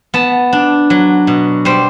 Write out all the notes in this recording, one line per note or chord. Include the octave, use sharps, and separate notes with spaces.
B3 A5
D4
F#3
B2
G3 C5